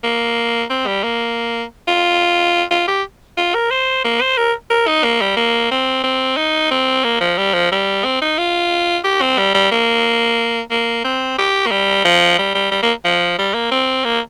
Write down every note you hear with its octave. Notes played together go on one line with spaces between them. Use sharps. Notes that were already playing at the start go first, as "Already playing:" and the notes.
A#3
C4
G3
A#3
F4
F4
G4
F4
A#4
C5
A#3
C5
A#4
A#4
D#4
A#3
G3
A#3
C4
C4
D#4
C4
A#3
F3
G3
F3
G3
C4
D#4
F4
G4
C4
G3
G3
A#3
A#3
C4
G4
A#3
G3
F3
G3
G3
G3
A#3
F3
G3
A#3
C4
A#3